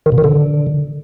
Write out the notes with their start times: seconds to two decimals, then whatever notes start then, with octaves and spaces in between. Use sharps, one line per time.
0.06 D#3
0.12 B2
0.18 D#3
0.24 D3